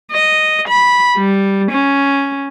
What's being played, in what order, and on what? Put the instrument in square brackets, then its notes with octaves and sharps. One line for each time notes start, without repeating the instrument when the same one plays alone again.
[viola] D#5
B5
G3
C#4